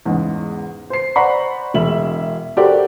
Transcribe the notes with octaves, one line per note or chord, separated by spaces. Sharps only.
E2 G#2 C#3 G#3
C5 C7
C5 D5 F#5 A#5 B5 C#6
E1 E5 F#7
F#4 G4 A4 A#4 C5 D5